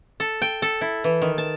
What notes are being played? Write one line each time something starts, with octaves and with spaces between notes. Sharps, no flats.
A4
G5
A4
E4
E3
D#3
A5